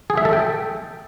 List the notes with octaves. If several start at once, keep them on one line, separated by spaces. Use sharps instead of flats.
G#4
E5
A4
G5